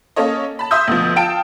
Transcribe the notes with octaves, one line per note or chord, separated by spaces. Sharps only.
A#3 C#4 A4 C#5 D#5
A5 B5
E5 C6 D#6 E6 G6
D2 B2 F3
F4 G5 A5 D7